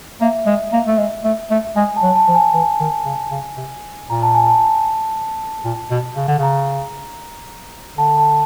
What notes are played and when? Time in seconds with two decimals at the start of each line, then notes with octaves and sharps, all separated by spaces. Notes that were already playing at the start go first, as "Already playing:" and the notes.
0.21 A#3 E5
0.47 G#3
0.73 A#3
0.87 A3
0.98 G#3
1.25 A3
1.51 A3
1.76 G#3 G#5
1.96 A5
2.03 F#3
2.15 A5
2.28 F3
2.35 G#5
2.54 E3 G#5
2.80 D#3
3.06 C#3
3.31 C#3
3.57 C3
4.09 A#2 A#5
4.22 A5
4.34 G#5
4.47 A5
5.65 A#2
5.91 B2
6.17 C#3
6.28 D3
6.39 C#3 A#5
7.98 D3 A5
8.18 A5